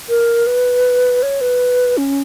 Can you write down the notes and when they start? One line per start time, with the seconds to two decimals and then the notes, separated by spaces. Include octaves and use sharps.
0.09 A#4
0.47 B4
1.23 C#5
1.41 B4
1.97 C#4